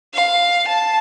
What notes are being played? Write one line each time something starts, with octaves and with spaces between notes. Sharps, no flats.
F5
A5